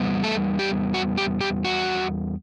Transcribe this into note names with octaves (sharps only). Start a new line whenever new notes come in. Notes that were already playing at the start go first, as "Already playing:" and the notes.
Already playing: E2 G3 B3
A3 A4
G4
F#4
G4
G4
F#4